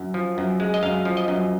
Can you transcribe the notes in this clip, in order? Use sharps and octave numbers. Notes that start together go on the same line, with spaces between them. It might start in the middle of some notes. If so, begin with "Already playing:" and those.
Already playing: F#2
F3
F#2
G#3
D#5
F#2 F5
F3
D#5
F#2